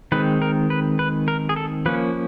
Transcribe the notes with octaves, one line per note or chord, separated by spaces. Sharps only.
D#3 G#3 C4 B4
A#4
B4
B4
A#4
G#4
A4
F3 A#3 C#4 B4